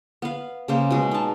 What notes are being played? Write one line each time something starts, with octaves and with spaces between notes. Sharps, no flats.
B3 F5
C#3 A#3 C5
B2 G#3
D#4 A5